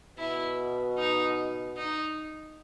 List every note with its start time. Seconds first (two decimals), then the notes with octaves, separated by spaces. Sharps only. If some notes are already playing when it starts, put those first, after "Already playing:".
0.18 B2 E4
0.98 D#4
1.77 D#4